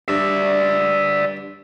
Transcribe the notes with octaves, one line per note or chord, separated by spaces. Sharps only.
G2 D5 E5